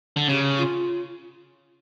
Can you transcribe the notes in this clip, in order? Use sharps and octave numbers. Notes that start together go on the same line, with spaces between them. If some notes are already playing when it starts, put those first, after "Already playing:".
D3
C#3 G4
F4